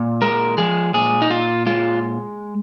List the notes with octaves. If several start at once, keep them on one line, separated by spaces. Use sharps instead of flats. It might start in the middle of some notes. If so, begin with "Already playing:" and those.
Already playing: A#2
G#3 A#4
F3 G#4
A#2 G#4
D#4
A#2 F4
G#3 F4